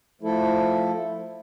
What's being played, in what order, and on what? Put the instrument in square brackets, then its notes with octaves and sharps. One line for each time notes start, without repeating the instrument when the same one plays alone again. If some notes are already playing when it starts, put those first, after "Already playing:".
[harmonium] F3 A3 E4 A4